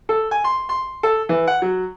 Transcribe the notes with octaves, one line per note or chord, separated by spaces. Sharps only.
A4
G#5
C6
C6
A4
E3
F#5
F#3